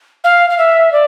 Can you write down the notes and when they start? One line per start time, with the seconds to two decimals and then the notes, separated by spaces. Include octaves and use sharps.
0.24 F5
0.49 F5
0.58 E5
0.92 D5